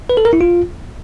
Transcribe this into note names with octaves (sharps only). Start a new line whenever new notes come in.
B4
A4
A#4
E4
F4